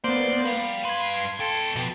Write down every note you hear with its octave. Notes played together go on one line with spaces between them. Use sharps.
A#3 B3 C5 D5
F5 G5 B5
G2 B4 C6 G#6
B2 A4 G5
F2 B2